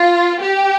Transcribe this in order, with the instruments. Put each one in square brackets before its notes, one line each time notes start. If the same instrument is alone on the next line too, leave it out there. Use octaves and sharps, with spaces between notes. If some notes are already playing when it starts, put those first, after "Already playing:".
Already playing: [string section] F4
G4